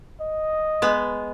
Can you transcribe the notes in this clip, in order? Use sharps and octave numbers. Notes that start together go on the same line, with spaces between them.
D#5
G#3 B3